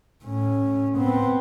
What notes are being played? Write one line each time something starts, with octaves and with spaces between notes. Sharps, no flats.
A2 C#4
B3 C4